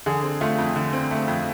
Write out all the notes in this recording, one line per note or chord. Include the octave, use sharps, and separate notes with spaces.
D3 G#4
C4
A3 F4
F2
D3
C4
A3
F2